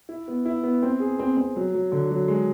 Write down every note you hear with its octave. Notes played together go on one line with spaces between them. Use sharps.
E4
B3
E4
B3
C4
G#4
C4
C4
F#3
F#3
D3
F#3
G#3